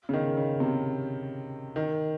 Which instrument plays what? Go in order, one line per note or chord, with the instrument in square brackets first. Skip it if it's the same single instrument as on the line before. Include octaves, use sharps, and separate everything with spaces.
[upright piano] C#3
D#3
C#3
C3
D#3